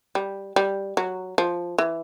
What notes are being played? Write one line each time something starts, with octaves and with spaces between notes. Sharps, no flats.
G3
G3
F#3
F3
E3